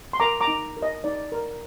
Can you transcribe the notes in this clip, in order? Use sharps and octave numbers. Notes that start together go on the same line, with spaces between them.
C6
A#4 A#5 D6
A#5 D6
D#4
A#4
D#5
D#4 D5
A#4